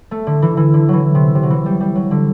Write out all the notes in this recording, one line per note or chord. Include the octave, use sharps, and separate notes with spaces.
A3
D3
E3
E3
D3
E3 F#3
C3
C3
F#3
E3
G3
G3
F#3
D3